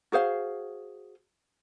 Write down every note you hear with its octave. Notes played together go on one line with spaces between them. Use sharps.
F#4 G#4 C5 F5